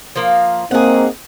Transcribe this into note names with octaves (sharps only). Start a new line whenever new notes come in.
F3 A#3
A#3 C4 D#4 G#4 F#5